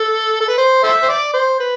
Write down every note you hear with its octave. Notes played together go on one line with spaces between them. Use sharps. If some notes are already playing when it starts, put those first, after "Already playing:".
Already playing: A4
A4
B4
C5
A4 C5 E5
C5
D5
C5
B4